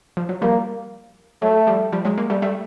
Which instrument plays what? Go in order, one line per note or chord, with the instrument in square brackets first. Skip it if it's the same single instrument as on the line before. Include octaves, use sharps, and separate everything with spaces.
[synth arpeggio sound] F3
F#3
[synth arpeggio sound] F3 G3 [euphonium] A#3
[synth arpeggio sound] F#3 [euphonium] A3
[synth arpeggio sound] F3 G3
F3 G3
F#3 G#3
G#3 A#3
G3 A3
G3 A3